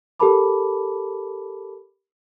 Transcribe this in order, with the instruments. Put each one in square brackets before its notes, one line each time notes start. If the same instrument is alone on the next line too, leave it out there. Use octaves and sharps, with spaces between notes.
[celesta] G4 A4 A#4 A5 B5 D6